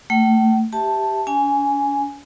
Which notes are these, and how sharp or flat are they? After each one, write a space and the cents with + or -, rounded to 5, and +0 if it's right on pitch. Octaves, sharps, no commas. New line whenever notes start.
A3 +20 G5 -40
G4 +0 E5 -10 A5 +0
C#4 +45 G#5 +0